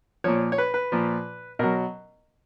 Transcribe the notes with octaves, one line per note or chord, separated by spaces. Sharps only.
A#2 F3 C#5
C#5
B4
B4
A#2 F3
B2 F#3 A#4